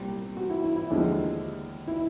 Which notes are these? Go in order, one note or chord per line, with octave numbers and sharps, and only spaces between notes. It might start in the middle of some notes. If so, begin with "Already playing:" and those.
Already playing: C2 A#2 G3 G4
F#4
E4
E4
E4
D#2 D3 F3 G#3
E4